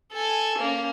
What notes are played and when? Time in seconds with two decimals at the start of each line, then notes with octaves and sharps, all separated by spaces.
0.13 A4 G#5
0.59 A#3 C#4